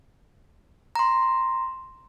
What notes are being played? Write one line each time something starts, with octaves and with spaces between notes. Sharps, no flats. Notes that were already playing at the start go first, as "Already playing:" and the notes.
A#5 C6